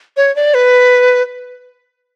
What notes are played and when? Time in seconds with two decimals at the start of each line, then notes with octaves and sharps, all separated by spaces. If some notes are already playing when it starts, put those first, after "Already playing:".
0.17 C#5
0.36 D5
0.54 B4